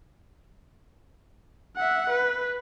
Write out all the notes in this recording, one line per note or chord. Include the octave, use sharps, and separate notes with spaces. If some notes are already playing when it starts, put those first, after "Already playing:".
E5 F#5
B4